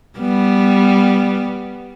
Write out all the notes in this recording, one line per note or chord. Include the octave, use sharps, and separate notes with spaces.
G3 B3